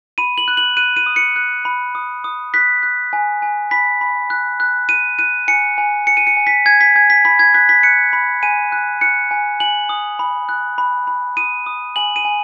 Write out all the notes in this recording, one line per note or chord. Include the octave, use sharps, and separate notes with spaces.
B5 D#7
F#7
F#6
F#7
F#6 D#7
D#7
D#6
C#7
F#6
B5
D#6
D#6
F#6 B6
F#6
G#5
G#5
B5 B6
B5
F#6
F#6
F#6 D#7
F#6 D#7
G#5 C#7
G#5
G#5 C#7
D#7
C#7
G#5
B6
G#5 G#6
B6
G#5 G#6
B6
B5 B6
G#6
F#6 B6
B6
F#6 C#7
B5
G#5 D#7
F#6
F#6 C#7
G#5
G#5 F#7
D#6
B5
F#6
B5
B5
D#6 D#7
D#6
G#5 F#7
D#7
G#5